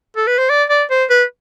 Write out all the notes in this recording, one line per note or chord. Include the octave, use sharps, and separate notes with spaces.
A4
B4
C5
D5
D5
C5
B4